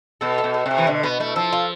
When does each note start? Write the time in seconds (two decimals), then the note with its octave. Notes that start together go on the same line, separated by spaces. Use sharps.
0.21 B2 A4
0.38 A3
0.44 B2
0.54 A3
0.66 C3
0.71 A3
0.78 E3
0.87 B2 D3
1.03 B2 B3
1.20 A3 E4
1.36 F3 A4
1.53 F4